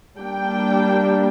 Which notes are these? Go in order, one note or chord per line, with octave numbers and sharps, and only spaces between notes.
G3 A#3 D4 G5